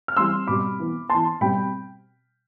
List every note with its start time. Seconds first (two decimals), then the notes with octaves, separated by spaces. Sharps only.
0.08 F6
0.17 E3 G3 C4 C6 E6
0.47 B2 G3 C4 B5 D6
0.79 E3 B3
1.10 E3 B3 A5 C6
1.41 B2 G3 C4 G5 B5